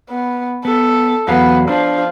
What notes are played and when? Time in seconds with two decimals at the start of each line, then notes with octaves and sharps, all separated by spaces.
0.10 B3
0.65 B3 A4
1.28 E2 F#3 B3 F5
1.69 F3 D4